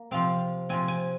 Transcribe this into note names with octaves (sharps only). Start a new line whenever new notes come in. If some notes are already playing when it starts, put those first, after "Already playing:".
Already playing: A#3
C3 F3 C4 F5
C3 F3 C4 G#5
G#5